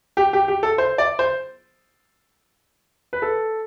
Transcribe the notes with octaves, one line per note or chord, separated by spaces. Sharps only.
G4
G4
G4
A4
C5
D5
C5
B4
A4